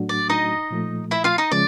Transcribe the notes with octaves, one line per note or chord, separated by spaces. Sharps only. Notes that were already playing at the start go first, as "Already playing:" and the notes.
Already playing: A2 F#3 A3 D4 F#4
D5
D#4 D#5
A#2 F3 A3
E4 E5
F4 F5
D#4 D#5
C#3 F3 G#3 C#4 D5